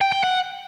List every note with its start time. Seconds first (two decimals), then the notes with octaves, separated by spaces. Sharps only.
0.01 G5
0.12 G5
0.23 F#5